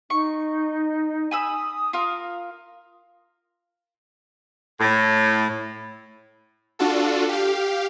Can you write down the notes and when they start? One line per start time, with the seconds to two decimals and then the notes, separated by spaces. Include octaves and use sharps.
0.10 D#4 C#6
1.31 G#5 B5 D#6 E6
1.93 F4 A#4 F5
4.80 A2
6.79 D4 F4 F#4 A4
7.29 G4 F5